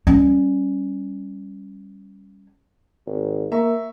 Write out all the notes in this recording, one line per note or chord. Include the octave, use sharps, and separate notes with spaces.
G3 C#4
G#1
A#3 E5 A#5 C#6